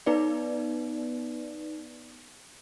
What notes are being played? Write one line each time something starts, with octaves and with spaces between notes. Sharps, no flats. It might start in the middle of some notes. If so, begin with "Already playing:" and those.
B3 D#4 B4 D5